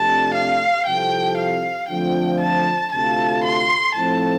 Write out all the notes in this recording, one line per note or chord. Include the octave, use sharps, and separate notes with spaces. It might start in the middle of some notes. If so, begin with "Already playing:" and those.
Already playing: F2 C3 A3 D4 G4 A5
F5
C2 C3 F3 C4 A4 G5
F5
D3 F3 A3 C4 F4 G5
A5
D2 C3 A3 F4 A4 A5
C6
A2 F3 A3 C4 A4 A5